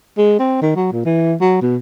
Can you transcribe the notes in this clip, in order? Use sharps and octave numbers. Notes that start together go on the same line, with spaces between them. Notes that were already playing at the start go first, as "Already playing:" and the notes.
G#3
C4
D#3
F#3
A#2
E3
F#3
B2